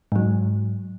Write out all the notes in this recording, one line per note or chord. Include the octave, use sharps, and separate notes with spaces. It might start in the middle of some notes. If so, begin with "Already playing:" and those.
G#2 F#3